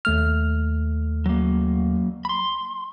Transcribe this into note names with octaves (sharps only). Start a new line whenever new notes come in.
D#2 A3 F6
F#3 A#3
B5 C6